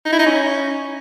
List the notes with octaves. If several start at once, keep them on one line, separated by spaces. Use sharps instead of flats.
D#4
E4
D#4
C#4